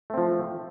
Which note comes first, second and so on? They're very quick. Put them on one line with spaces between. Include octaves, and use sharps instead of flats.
A3 C4 F3